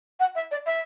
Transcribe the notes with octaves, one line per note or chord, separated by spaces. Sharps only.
F#5
E5
D5
E5